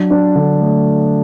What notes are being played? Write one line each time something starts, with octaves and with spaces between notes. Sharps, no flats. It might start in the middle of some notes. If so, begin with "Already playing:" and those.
Already playing: F#3 D4
D4
D3
A3